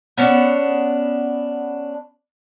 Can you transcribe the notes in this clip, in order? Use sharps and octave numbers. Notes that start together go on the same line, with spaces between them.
B3 C#4 D4